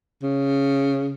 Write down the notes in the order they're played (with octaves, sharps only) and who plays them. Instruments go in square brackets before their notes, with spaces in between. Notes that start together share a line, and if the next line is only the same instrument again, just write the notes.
[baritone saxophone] C#3